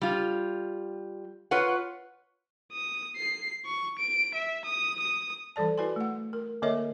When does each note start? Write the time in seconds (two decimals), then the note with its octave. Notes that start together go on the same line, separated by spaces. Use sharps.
0.02 G3 F4
1.51 F4 B4 C#5 F#5
2.72 D#6
3.17 C7
3.65 C#6
3.99 D7
4.34 E5
4.65 D#6
5.00 D#6
5.56 E3 G3 A4 D5 A5
5.78 E4 F#4 B4 D5 G#5 C6
5.96 A3 F#5
6.33 A#4
6.62 D3 A#3 A#4 C#5 D#5 E5